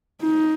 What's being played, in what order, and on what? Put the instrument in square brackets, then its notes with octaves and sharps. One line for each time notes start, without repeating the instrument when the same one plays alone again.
[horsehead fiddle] D#4